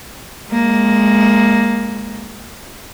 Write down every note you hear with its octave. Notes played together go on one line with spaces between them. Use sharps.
G#3 A#3